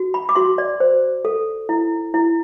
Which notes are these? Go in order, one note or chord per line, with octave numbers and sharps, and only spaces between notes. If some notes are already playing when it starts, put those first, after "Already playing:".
Already playing: F#4
B5
D6
F#4 C6
D5
C5
A4
E4
E4